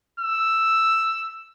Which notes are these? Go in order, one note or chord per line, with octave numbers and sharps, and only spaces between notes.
E6